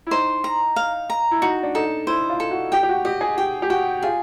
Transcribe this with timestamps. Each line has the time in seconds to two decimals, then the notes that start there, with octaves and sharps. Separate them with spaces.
0.07 E4
0.11 D#4 C5
0.44 A#5
0.76 F5
1.10 A#5
1.31 E4
1.41 D#4 F#4
1.63 D4
1.75 D#4 A4
2.07 E4 C5
2.29 F4
2.40 A4
2.51 F#4
2.72 G4 G5
2.83 G4
2.89 F#4
3.05 G4 D#5
3.21 G#4
3.37 G4 G5
3.62 G4
3.70 F#4 G5
4.03 F4 G#4